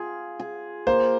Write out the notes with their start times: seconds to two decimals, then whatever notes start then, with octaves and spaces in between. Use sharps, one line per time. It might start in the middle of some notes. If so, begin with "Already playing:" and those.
Already playing: F4 G#4
0.40 G#4
0.87 A#3 C5